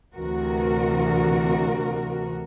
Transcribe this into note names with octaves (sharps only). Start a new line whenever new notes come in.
D2 C3 E3 F#4 A#4